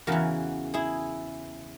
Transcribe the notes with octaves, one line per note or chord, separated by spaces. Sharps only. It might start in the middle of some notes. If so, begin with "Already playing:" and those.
E2 C#3 E3 F#4 A#4
E4 G#4